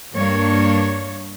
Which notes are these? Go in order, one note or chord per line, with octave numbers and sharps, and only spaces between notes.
G2 A#3 D4 C#5